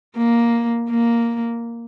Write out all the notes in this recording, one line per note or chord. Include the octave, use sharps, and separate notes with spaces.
A#3
A#3